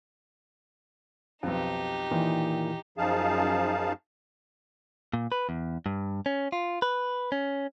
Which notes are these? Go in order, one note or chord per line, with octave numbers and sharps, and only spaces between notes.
B1 F2 D#4 G4
A#2 D#3 E3
F#2 F3 D#4 G#4 F5 A5
A#2
B4
E2
G2
C#4
F4
B4
C#4